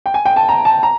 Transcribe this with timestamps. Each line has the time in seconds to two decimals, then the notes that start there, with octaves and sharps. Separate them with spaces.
0.06 G5
0.14 G#5
0.25 G5
0.36 A5
0.49 A#5
0.65 A5
0.83 A#5